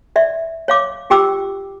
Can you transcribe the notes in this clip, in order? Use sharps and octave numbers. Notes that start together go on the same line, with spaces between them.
D5 E5
C#5 F5 D6
F4 G4 G5 D6 E6